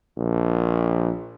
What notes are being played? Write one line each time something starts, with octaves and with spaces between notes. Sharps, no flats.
A#1